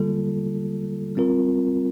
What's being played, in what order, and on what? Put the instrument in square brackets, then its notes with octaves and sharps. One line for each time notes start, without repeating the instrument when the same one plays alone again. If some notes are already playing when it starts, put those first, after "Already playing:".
Already playing: [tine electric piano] D3 G3 A#3 F4 A4
G3 C4 F4 A#4